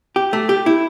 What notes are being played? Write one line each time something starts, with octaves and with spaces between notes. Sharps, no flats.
G4
A3
G4
E4